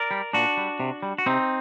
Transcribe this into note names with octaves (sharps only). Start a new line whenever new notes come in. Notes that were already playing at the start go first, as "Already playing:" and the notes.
Already playing: A#4 D5
G3
A#2 D4 F#4
G3
C3
G3
F#4
C3 C4 D#4